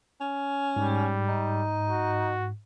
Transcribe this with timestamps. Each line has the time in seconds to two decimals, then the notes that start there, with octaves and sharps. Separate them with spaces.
0.21 C#4
0.76 G#2 G3
1.28 D#4
1.88 F#4